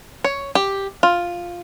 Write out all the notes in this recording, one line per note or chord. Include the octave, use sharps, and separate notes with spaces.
C#5
G4
F4